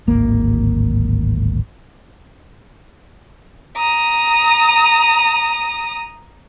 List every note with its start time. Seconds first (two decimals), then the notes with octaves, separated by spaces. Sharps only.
0.07 D1 G#1 A#3
3.77 A#5 D#6